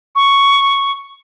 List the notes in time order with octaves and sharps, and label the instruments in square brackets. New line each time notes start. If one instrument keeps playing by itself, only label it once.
[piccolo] C#6